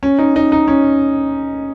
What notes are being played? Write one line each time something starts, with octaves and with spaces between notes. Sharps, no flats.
C#4
D#4
D#4
D#4
C#4